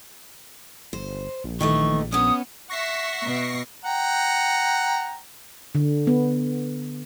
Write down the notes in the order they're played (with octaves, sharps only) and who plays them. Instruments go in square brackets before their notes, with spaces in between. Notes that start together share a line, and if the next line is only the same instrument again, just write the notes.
[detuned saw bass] G1 [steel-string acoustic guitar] C5
[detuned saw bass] A#1
[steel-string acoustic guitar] D#3 E3 A3 [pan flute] C#6
[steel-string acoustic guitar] B3 C#4 [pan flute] D#6
[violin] E5 F#5 [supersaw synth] C#6 A#6 C7
[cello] B2
[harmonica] F#5 G5 A#5
[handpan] D3
B3